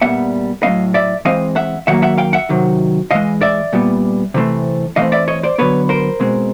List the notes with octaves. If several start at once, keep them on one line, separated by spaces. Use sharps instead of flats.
A#2 G3 B3 E5 F#5
A2 F#3 A3 C4 D#5 F5
D5 E5
E3 G#3 C4 D#5 F5
E5 F#5
D#3 F#3 A#3 E5 F#5
E5 F#5
F5 G5
E5 F#5
C3 D#3 F#3
C3 E3 G#3 D#5 F5
D5 E5
A#2 G3 B3
C3 E3 A3 C4
E3 A3 C4 D#5 F5
D5 E5
C#5 D#5
C5 D5
D3 F#3 B3 B4 C#5
A#4 C5
B2 G#3 C4